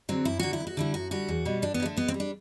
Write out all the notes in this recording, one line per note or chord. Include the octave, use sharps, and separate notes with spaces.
D3 F#3 C4
F#2 E4
D3 F#3 F#4
E4
E2
F#4
D3 G3 E4
F#2 F#4
D3 G3 F#4
E2
B2 G3
G2 D4
B3
D3 G3
A3
B2 B3
C4
G3
D4